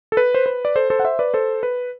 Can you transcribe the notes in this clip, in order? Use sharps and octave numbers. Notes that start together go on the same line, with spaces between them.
A4
B4
C5
B4
D5
A4 C5
A4 C5
F#5
C5 E5
B4 D5
A4 C5
B4